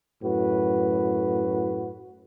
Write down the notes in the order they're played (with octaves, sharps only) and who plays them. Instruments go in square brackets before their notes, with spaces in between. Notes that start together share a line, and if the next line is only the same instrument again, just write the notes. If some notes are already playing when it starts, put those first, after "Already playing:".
[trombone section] F#2 A2 F#4 B4